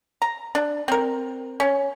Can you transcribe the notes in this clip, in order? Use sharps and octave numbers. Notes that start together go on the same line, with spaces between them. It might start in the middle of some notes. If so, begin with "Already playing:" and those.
A#5
D4
C4 A#4
C#4